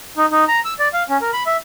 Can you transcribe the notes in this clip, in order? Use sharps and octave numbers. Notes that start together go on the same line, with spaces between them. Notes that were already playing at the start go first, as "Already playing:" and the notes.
D#4
D#4
A#5
E6
D5
F5
C#4
A#4
B5
E5